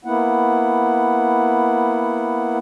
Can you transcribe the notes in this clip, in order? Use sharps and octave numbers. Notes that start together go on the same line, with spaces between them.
A#3 B3 E4 F#5